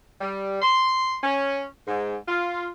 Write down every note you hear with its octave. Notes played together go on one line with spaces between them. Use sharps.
G3
C6
C#4
G#2
F4